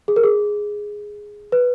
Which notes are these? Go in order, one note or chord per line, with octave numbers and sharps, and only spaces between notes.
G#4
A#4
G#4
B4